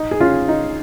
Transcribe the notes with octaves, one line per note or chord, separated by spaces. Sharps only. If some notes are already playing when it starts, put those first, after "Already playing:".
Already playing: D#4
G#4
C#4 F4
D#4